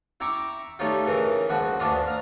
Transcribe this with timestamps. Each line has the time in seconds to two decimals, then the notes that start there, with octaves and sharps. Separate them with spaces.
0.20 E4 G5 A#5 C#6 D6
0.79 G3 A3 C#4 D#4 F4
1.06 C#3 E3 A#4
1.49 C#2 F3 F#4 B5
1.79 D2 C#4 D4 F4 D#5
2.08 F5 A#5